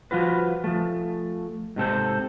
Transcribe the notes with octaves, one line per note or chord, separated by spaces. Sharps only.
F3 F4 F#4 B4
F3 A3
G#2 C3 A4 C5